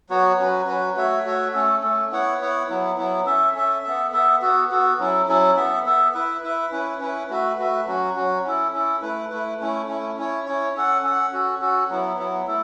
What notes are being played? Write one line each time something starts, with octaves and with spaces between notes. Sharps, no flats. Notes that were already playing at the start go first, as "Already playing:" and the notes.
F#3 B3 F#4 C#5
F#3 C#4 F#4 B4
F#3 C#4 F#4 B4
A3 F#4 C#5 E5
A3 F#4 C#5 E5
A3 C#4 A4
A3 C#4 A4
B3 E4 C#5 F#5
B3 E4 C#5 F#5
F#3 B3 E4
F#3 B3 E4
C#4 A4 E5
C#4 A4 E5
B3 A4 E5
B3 A4 E5
B3 F#4 A4
B3 F#4 A4
F#3 C#4 E4 A4
F#3 C#4 E4 A4
B3 A4 E5
B3 A4 E5
E4 B4 E5
E4 B4 E5
C#4 E4 B4
C#4 E4 B4
A3 F#4 B4 E5
A3 F#4 B4 E5
F#3 C#4 F#4
F#3 C#4 F#4
C#4 E4 A4
C#4 E4 A4
A3 E4 B4
A3 E4 B4
A3 C#4 E4
A3 C#4 E4
C#4 E4 C#5
C#4 E4 C#5
C#4 A4 F#5
C#4 A4 F#5
C#4 F#4 A4
C#4 F#4 A4
F#3 B3 E4
F#3 B3 E4
A3 E4 A4